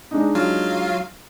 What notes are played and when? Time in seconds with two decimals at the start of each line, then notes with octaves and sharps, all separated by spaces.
0.11 G#3 D4 D#4
0.35 F#3 F4 F5